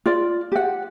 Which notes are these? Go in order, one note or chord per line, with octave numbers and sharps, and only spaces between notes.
F4 D5
G4 F#5